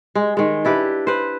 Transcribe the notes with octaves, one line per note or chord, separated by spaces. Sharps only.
G#3
D#3 G#3
D4 E4 G4 B4
B4 C5